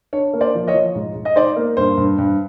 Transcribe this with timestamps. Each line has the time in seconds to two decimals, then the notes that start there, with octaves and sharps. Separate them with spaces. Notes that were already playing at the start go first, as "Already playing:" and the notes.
0.13 D4 C#5
0.34 A#3
0.40 C5 D5
0.55 F3
0.68 C#5 D#5
0.74 F3
0.95 G#2
1.15 G#2
1.25 D#5
1.36 D#4 C5 D5
1.56 A#3
1.77 G2 C5
1.98 G2
2.18 G2